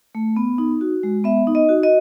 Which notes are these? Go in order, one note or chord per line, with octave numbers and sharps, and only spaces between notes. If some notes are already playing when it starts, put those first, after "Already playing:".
A3
B3
D#4
F#4
G#3
B3 E5
D#4
D#5
F#4
D#5